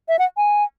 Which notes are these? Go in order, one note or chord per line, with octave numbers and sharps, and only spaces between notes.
E5
F#5
G#5